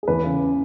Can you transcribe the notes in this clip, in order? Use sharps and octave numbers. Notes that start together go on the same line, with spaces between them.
G#4
E2 B4
C#3